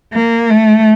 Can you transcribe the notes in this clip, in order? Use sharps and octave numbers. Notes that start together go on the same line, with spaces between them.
A#3
A3